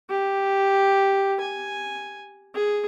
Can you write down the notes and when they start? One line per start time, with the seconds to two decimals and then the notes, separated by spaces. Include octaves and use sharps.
0.10 G4
1.40 G#5
2.55 G#4